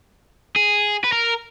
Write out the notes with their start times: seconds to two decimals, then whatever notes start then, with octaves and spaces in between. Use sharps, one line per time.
0.56 G#4
1.04 B4
1.13 A#4